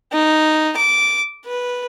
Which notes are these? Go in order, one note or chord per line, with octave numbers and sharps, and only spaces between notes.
D#4
D6
B4